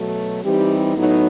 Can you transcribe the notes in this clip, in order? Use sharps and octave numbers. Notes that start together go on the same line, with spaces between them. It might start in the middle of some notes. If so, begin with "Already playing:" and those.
Already playing: B2 F#3 A3
E3 G3 C4 D#4 G4
A2 F#3 B3 D#4